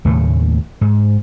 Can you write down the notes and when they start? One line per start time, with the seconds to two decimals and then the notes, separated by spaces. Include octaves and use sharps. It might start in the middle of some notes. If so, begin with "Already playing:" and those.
0.05 D#2 A2 C#3 A3
0.81 G#2